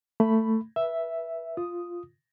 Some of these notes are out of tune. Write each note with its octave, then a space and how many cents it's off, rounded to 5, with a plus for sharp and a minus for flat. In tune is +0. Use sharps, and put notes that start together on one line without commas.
A3 +15 B5 +0
B4 -20 E5 +0
F4 +0 D#6 +0